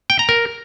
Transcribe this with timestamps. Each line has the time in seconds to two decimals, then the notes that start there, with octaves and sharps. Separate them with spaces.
0.10 G5
0.19 A#5
0.29 A#4